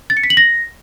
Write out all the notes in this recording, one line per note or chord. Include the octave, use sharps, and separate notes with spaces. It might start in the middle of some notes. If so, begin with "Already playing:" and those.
A6
C#7
B6
F#7
A#6